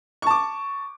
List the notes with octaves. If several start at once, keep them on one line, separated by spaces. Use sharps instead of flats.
A5 C#6 D6